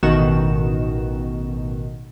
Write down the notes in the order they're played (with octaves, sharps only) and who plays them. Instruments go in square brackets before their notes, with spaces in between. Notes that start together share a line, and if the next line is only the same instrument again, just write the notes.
[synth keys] A1 B2 D#3 F#4 E7